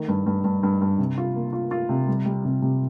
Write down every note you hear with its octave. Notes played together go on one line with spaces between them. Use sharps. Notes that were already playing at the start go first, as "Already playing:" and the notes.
Already playing: D#3 A3
G2
G2
G2
G2
G2
C3
F4
A#3
F4
F4
C3
G3
G3
C3
C3